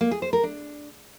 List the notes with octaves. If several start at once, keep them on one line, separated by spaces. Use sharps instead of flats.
A#3
G#4
C5
A#4
D4